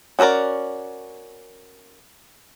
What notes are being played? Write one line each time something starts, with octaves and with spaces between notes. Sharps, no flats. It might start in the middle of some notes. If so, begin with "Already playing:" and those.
C#4 F#4 A4 A#4 D5